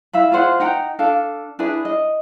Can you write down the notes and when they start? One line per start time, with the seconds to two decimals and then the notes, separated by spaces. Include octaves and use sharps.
0.13 E4 E5 F5 B5
0.32 F4 G#4 C5 F#5
0.60 D#4 F#5 G5 A#5
0.99 D4 A4 F5
1.59 D4 E4 G#4 B4
1.85 D#5